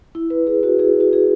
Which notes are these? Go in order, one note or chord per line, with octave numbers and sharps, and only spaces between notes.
E4
B4
E4 G#4
F#4
E4 G#4
F#4
E4 G#4